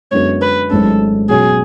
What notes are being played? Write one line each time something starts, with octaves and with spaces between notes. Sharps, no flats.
F#2 D3 G#3 B3 F#4 C#5
B4
G#1 G#2 F#3 A3 C#4 A4
B2 F#3 C#4 F#4 G#4 C#5